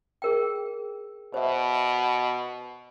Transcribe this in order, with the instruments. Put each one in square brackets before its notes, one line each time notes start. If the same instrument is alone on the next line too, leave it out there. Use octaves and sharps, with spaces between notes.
[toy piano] G#4 A#4 G5
[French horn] B2 [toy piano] C5 E5